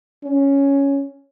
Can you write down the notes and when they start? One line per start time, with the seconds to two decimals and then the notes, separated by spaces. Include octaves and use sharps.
0.24 C#4